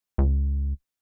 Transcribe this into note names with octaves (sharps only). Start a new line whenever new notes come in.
C#2